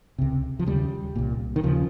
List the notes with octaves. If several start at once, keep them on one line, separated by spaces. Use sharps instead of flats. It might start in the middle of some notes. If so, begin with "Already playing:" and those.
C#2 C3
F3
D#2 C#3 G3
C2 A#2
D#3
D#2 C#3 F3